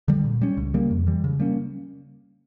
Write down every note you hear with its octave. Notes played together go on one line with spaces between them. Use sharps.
D3 G3
A#2
G3 C#4
C#2
C#3 G3 A#3
F2
E3 G3
C#3
G3 A#3 C#4